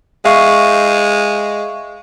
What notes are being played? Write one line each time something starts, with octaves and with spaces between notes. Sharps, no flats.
G#3 E5 F5 C#6